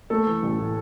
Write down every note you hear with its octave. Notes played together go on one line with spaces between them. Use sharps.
A3 A4
E3
A1
A2